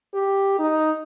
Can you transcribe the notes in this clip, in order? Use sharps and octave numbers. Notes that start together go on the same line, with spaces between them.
G4
D#4